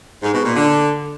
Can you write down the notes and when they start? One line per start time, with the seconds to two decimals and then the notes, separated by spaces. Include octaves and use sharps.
0.23 G#2
0.33 B2
0.44 A#2
0.55 D3